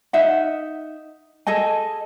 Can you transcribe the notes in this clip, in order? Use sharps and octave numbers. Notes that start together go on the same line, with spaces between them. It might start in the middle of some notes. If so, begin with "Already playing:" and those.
D#4 E5 F#5
G#4 A4 D#5 G#5